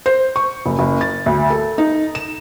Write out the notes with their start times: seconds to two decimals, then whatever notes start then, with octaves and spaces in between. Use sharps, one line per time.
0.06 C5
0.36 C#6
0.66 F#1
0.79 F#1
1.01 A6
1.26 D2
1.50 A4
1.78 D#4
2.15 E7